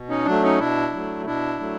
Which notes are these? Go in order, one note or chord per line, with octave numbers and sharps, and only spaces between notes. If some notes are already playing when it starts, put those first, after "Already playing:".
Already playing: B2
C#4 D#4
F#3 A3 D4
C#4 D#4
B2 D4 E4
F#3 A3
B2 D4 E4
F#3 A3